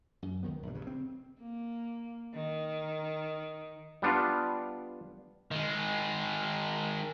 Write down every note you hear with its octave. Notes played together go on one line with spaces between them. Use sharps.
F#2
C#2 D#3 B3
A#1 G2
G2 C#3
C4
A#3
D#3
G3 B3 D4 F4
D#3 G#3